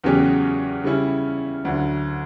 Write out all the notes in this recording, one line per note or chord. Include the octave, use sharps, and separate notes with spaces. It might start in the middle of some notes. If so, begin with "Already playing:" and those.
E2 C#3 F#3 C#4 G4
C#3 G3 C#4 E4
D2 D3 F#3